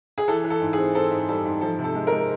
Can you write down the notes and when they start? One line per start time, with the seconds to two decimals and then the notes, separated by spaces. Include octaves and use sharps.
0.18 G#4
0.28 E3 A4
0.44 E3
0.50 A4
0.61 G#2
0.73 G#4
0.78 C4
0.95 C4 A4
1.11 G#2
1.29 G3 A4
1.45 G#2
1.61 F3 A4
1.78 C3
1.84 A4
1.95 G#3
2.07 A#4
2.12 G#3